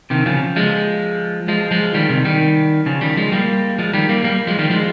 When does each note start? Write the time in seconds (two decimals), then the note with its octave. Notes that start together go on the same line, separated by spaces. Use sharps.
0.10 C3 D#3
0.26 C#3 F3
0.56 F3 G#3
1.48 F3 G#3
1.71 F3 G#3
1.94 D#3 G3
2.09 C3 D#3
2.25 D#3 G3
2.86 C#3 F3
3.01 D#3 G3
3.17 F3 G#3
3.32 G3 A#3
3.78 F3 G#3
3.93 D#3 G3
4.09 G3 A#3
4.24 G3 A#3
4.47 F3 G#3
4.59 D#3 G3
4.70 F3 G#3